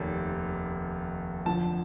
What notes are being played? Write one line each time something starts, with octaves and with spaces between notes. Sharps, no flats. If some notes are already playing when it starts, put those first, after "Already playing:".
Already playing: F1 D#2 D#3
F2 D3 F3 A5